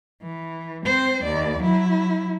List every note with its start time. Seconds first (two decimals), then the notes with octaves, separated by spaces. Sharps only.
0.22 E3
0.85 C4 C5
1.24 D#2 D5
1.61 F#3 E4